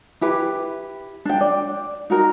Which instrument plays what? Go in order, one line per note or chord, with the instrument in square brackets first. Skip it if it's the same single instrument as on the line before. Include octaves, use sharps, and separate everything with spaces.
[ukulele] E4 G4 B4
D4 G5
D5
D#4 F#4 A#4